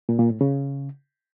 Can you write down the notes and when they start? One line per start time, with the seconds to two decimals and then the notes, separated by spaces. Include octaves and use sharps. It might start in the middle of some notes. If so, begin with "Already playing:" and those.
0.09 A#2
0.19 A#2
0.30 A2
0.41 C#3